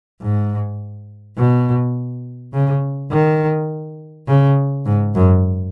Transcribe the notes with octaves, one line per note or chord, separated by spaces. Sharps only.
G#2
B2
C#3
D#3
C#3
G#2
F#2